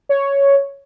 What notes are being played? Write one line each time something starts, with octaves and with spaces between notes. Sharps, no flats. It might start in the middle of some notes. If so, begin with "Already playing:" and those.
C#5